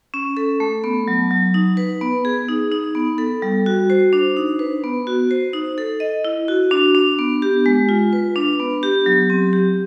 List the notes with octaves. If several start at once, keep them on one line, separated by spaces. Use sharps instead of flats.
C#4
A4
A3
B3
F#3
F#3
D#4
B4
B3
G#4
D#4
D#4
B3
A4
G3
F#4
C5
D4
D#4
B4
B3
F#4
C5
D#4
A4
D#5
E4
F#4
D4
D4
B3
G4
G#3
F4
B4
D4
B3
G4
F#3
C4
G4